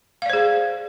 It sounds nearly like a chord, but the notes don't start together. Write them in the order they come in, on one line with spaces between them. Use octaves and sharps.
F5 D5 C5 G#4